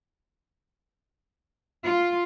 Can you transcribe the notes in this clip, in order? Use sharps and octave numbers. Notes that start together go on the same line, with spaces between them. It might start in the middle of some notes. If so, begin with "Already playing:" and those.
F4